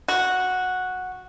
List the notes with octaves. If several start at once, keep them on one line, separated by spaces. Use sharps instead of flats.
F#4